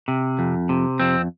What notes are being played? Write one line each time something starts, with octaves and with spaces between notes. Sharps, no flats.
C3
F2
C3
F2 C4